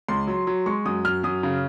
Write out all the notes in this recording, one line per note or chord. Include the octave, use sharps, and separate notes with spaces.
C#2 C6
F#3
F#3
G#3 C#6
F#2 D#6
F#2 F6
F#2 D#6
C#3